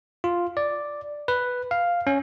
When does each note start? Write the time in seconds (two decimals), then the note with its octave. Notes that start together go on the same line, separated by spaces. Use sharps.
0.24 F4
0.57 D5
1.28 B4
1.71 F5
2.07 C#4